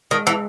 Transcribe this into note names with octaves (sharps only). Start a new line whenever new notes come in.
D#3 G#3
E3